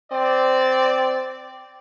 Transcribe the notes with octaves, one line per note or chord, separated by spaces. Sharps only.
C4 D5